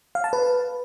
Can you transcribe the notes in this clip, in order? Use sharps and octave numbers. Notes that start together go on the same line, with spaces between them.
F5
A5
B4